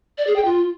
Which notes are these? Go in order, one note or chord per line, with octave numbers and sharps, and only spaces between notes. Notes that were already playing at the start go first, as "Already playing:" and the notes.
D5
G#4
G5
F4